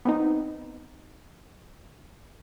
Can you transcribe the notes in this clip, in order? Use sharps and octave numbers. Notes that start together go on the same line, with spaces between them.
B3 C4 D#4